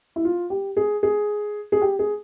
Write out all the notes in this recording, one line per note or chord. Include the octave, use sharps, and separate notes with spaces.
E4
F4
G4
G#4
G#4
G#4
G4
G#4